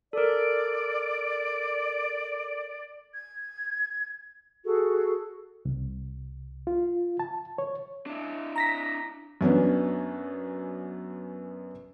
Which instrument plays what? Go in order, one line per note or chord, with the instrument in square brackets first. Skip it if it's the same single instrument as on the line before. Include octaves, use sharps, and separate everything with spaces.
[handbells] A4 A#4 [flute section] D5
[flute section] G#6
F#4 G#4 A4
[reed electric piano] C2
F4
A5
C#5
[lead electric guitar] D4 E4
[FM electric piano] A#5 A#6 B6
[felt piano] F#2 B3 C#4 D4